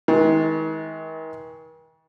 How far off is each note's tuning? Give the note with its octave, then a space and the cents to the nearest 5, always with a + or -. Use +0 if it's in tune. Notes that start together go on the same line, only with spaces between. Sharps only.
D#3 +45 G#3 +25